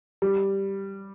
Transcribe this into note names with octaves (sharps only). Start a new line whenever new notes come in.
G3